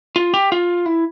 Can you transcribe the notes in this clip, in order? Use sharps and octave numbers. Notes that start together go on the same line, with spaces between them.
F4
G4
F4
E4